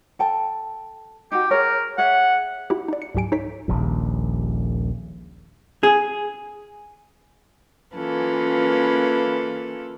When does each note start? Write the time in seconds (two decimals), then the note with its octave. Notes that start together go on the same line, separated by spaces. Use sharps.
0.19 A4 G5 A5
1.32 D#4 F#4 G4
1.51 G#4 A#4 C#5
1.98 G#4 C#5 E5 F#5
2.70 E4 F#4 G4
2.88 D#4 D5
3.02 C#7
3.15 C#2 G#2 F#3 G4 G#5 D7
3.32 D#4 A4 C#5 B6
3.68 D#1 A#1 D#2
5.83 G#4
7.96 E3 A#3 C#4 F4 A4 B4